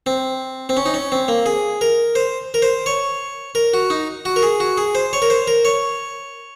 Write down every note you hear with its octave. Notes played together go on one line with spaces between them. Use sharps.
C4
C4
C#4
D#4
C#4
C4
A#3
G#4
A#4
C5
A#4
C5
C#5
A#4
F#4
D#4
F#4
A#4
G#4
F#4
G#4
C5
C#5
A#4
C5
A#4
C#5